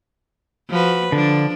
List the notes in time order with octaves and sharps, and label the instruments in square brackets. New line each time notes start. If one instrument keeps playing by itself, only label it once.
[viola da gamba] F3 F#4 B4
[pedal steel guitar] D3 [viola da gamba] F3 D4